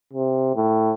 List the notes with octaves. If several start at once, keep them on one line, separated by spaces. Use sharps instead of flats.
C3
A2